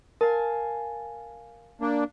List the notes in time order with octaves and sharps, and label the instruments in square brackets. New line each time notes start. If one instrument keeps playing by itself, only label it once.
[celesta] A#4 [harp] F5 G#5 A5
[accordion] A#3 D4